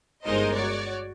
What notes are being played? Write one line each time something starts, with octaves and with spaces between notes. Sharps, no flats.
G1 G#3 D#4 A#4 C5 D#5
F#4 C#5 D5